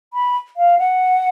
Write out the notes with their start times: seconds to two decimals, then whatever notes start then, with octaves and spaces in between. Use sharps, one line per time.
0.14 B5
0.57 F5
0.79 F#5